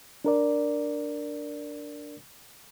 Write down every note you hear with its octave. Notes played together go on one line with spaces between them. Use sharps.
D4 A#4 D5